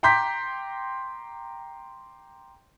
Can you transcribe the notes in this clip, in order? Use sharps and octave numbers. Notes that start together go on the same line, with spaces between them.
G5 A#5 C6 D6 G6 B6